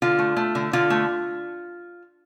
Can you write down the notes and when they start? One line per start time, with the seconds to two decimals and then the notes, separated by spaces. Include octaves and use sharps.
0.02 D3 F4
0.19 A3
0.36 A3
0.55 D3
0.73 D3 F4
0.90 A3